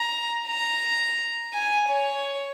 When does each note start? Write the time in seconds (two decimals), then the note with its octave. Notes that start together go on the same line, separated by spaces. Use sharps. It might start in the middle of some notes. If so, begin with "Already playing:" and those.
Already playing: A#5
0.47 A#5
1.53 G#5
1.89 C#5